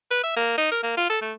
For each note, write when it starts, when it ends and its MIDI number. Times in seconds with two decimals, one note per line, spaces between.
0.11 0.22 71
0.24 0.34 76
0.36 0.53 58
0.58 0.68 63
0.71 0.80 70
0.83 0.93 58
0.97 1.05 65
1.10 1.19 69
1.22 1.33 57